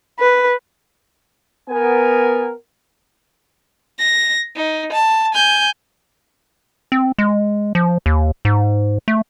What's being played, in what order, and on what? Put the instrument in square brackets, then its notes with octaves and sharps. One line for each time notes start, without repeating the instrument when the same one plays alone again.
[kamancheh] B4
[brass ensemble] B3 A#4 G#5
[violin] A#6
D#4
A5
G#5 G6
[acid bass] C4
G#3
F3
D#2
G#2
A3